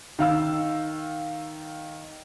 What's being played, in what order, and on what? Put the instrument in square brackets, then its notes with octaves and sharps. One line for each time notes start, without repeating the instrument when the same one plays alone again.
[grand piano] D#3 F5 E6